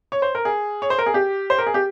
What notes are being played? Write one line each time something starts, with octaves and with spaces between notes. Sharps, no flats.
C#5
C5
A#4
G#4
C#5
C5
A#4
G#4
G4
C5
A#4
G#4
G4